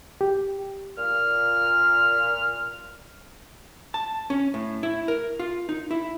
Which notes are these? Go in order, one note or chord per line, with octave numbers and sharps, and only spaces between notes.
G4
A#2 F6
A5
C#4
A2
E4
A#4
F4
D#4
E4